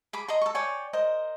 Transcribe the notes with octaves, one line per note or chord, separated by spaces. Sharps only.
G#4 B5 D6
D#5 A#5 C6
A4 C#6
C#5 D5 G5 G#5
A#4 C5 D#5